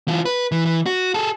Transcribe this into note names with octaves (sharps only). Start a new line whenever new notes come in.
E3 F4
B4
E3
E3
F#4
G#4 A4